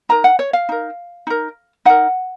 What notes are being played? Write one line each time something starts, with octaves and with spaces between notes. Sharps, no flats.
D#4 A#4 A#5
F#5
C#5
F5
D#4 A#4
D#4 A#4
D#4 A#4 F#5